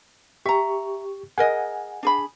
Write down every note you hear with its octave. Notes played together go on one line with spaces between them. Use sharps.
G4 E5 A#5 C#6
G#4 A#4 D#5 F#5 G#5
D4 G#4 B5